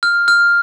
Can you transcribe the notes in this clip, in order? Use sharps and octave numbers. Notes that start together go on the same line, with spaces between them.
F6
F6